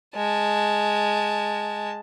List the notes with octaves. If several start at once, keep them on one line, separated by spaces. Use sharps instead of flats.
G#3 A5